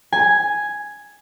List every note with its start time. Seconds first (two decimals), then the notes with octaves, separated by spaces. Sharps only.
0.12 G#5